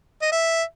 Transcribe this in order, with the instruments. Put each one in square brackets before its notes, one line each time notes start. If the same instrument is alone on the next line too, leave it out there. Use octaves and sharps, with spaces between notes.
[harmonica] D#5
E5